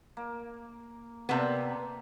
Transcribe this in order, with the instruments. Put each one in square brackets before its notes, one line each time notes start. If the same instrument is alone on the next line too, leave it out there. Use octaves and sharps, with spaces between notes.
[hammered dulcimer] A#3
[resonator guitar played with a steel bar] C3 B3 [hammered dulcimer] A#3 A4 D5